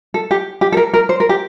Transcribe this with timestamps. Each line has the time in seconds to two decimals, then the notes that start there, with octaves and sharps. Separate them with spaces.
0.14 A4
0.31 G4
0.61 G4
0.72 A4
0.77 A#4
0.94 A#4
1.09 C5
1.20 A#4
1.29 G4